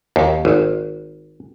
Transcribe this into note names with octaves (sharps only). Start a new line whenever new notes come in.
D#2
G#1